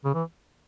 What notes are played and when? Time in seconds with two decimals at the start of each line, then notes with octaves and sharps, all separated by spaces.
0.05 C#3
0.14 E3